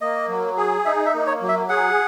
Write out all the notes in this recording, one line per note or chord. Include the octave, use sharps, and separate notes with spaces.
A#3 D#5
F#3
G#4
D#4 E5
E5
A#3
C#5
F#3
E5
G#4 F#5